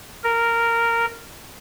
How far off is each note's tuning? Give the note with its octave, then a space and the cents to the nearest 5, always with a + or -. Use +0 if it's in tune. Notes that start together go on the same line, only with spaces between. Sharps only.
A#4 -10